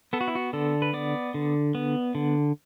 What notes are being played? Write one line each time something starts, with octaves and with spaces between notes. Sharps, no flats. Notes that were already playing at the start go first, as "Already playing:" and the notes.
B3 A4
F#4
E4
F#4
D3 A4
B4
B3 D5
D3
B3
D3